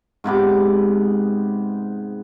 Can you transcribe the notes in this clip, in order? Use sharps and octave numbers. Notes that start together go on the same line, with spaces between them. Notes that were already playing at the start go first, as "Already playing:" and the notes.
G#2 C3 B3 D6